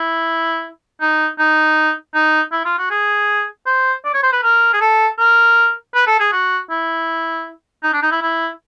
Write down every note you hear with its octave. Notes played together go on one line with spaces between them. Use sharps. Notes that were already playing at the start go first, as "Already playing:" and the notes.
Already playing: E4
D#4
D#4
D#4
E4
F4
F#4
G#4
C5
D5
C#5
C5
B4
A#4
G#4
A4
A#4
B4
A4
G#4
F#4
E4
D#4
D4
D#4
E4
E4